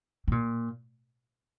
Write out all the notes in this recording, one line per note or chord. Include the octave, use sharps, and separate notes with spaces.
C3
A#2